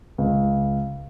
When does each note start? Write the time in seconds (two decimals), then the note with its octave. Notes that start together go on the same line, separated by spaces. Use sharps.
0.18 C#2